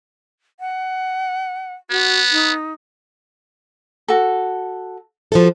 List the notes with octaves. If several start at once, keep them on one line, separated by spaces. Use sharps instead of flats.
F#5
B3 F#4
D#4
F#4 A4
F3 F#4 A4